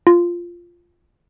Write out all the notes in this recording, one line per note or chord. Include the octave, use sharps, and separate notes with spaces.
F4